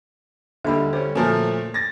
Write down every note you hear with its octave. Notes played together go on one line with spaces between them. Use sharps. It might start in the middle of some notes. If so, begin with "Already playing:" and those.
D#2 D3 G3 E5 B5
G3 C#4 C5
A#2 F3 A3 C#4 F#4 A#4 G#5 A5
A6 A#6